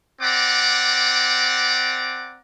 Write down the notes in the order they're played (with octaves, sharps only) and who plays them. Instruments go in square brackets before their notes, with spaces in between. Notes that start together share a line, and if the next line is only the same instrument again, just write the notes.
[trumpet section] C4 D5 F#5 A#5 D6